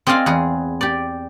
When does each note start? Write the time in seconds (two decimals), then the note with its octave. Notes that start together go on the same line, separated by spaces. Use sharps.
0.07 C4 G#4 D5 D#5 F5 G#5
0.26 E2 G#4
0.81 G4 D5